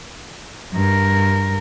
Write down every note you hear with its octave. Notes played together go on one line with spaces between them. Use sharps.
G2 A#4